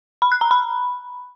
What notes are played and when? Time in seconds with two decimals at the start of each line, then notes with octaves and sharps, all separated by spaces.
0.22 B5
0.32 F#6
0.41 A#5
0.51 B5